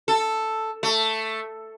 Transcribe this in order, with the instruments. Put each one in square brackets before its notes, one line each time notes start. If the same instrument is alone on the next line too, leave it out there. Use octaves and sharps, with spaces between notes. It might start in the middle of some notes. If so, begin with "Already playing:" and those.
[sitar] A4
A3